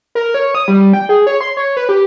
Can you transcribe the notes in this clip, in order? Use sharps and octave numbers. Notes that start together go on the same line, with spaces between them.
A#4
C#5
D#6
G3
G5
G#4
C#5
C6
C#5
B4
G4